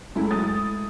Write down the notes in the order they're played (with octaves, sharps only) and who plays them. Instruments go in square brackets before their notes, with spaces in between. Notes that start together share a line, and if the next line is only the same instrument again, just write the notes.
[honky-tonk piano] F#2 [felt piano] G#3 A3 E4
[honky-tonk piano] D#6 A6